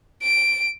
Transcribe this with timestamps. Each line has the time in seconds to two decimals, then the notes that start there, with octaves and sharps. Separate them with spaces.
0.23 D7